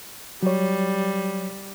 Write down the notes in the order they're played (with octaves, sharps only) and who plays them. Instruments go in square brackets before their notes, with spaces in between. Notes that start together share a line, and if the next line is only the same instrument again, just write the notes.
[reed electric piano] F#3 C#5 [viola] G3